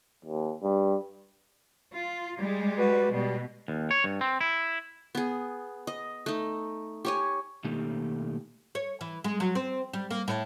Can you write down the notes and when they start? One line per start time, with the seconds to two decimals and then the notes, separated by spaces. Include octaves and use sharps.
0.25 D#2
0.63 G2
1.93 F4
2.37 G3 G#3
2.79 F#4 B4
3.12 B2 G3
3.68 D#2
3.91 C#5
4.04 G2
4.21 C4
4.41 E4
5.15 B3 G#4
5.87 D#5
6.26 A3 D#4
7.05 G4 C#5 G#5
7.64 B2 D#3 A3 A#3 D#4 G4
8.75 C#5
9.01 E3
9.24 G#3
9.40 F#3
9.55 C4
9.93 G3
10.11 A#3
10.28 A2